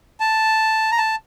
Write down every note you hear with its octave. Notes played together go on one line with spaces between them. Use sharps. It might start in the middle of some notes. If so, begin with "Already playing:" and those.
A5
A#5
A5